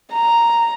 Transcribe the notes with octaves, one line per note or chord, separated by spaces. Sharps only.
A#5